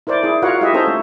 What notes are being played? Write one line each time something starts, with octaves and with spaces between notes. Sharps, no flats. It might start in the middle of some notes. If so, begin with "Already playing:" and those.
E4 A#4 C5 D5
E4 G#4
F4 F#4 A#4 C#5 F5 F#5
E4 F4 G4 D#5 E5
C#4 D#4 A4 C5 A#5
A3